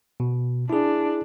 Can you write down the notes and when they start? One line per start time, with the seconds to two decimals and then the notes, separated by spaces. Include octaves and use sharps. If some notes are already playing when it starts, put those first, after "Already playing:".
0.20 B2
0.70 D4 E4 G#4